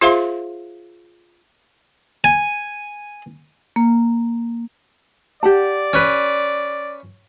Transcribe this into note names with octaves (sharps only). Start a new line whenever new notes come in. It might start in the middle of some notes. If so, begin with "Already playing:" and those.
F4 G#4 C5 E5 F5 C6
G#5
A#3
G4 D5 F#5 A5
C#4 B4